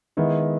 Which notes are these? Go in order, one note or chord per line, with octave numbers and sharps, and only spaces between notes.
D#3 G#3 B3 E4